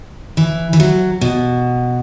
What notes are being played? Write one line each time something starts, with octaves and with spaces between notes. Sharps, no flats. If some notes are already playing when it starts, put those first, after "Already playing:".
E3
E3
F#3
B2